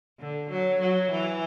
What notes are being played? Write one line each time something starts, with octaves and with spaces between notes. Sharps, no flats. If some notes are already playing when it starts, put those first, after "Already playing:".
D3
F#3
F#3
E3